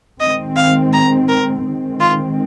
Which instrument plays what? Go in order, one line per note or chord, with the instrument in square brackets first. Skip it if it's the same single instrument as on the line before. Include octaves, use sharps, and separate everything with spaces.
[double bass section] D#3 G#3 C4 [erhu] D#5
[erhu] F5
A#5
A#4
[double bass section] D#3 G#3 C4
[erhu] F4